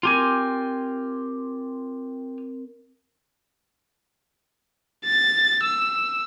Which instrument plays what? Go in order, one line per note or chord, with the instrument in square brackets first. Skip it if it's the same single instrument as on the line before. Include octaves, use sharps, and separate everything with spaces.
[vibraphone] C4 A#4 [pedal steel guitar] F4 G4 G#5
[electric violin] A6
E6